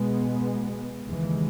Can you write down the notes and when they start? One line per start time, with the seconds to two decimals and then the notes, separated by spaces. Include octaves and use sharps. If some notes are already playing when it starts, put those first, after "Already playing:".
Already playing: B2 G#3 B3
1.08 D#2 C#3 E3 G#3